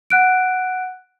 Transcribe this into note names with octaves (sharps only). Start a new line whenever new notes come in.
F#5 F#6 D7